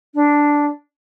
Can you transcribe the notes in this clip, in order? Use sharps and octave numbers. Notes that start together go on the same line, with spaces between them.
D4